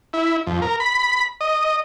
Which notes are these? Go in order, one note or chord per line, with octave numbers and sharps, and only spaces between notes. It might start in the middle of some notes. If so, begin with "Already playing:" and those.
E4
F2
A#4
B5
D#5